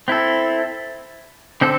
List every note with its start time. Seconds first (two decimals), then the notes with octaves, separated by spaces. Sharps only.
0.08 C4 E4 A4
1.61 D3 C4 A4